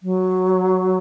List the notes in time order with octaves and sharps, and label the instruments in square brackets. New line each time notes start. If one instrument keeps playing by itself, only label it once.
[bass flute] F#3